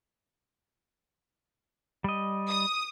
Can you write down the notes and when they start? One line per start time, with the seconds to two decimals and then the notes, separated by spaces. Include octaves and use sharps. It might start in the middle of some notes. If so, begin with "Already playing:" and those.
2.04 G3 D#5
2.49 D#6